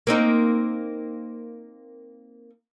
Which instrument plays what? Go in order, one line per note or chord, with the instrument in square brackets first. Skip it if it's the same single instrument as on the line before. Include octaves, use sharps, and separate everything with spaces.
[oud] A#3 C4 D#4